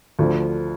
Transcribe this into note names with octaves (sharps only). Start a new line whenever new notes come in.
D2 D3 F3